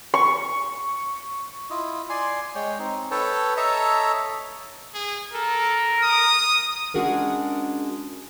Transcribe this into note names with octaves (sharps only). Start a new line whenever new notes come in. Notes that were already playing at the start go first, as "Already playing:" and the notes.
C#6
E4 F4 D#5
D5 G#5 C6
G#3 C#5 G5
C4 D#4
A4 B4 C#5 G5 A5
A4 C#5 D#5 E5 A5 A#5
G#4
A4 A#4
D#6
G#3 C#4 D4 F#4 G#4 A#4